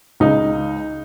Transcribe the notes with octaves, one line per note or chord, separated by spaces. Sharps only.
C#2 D#4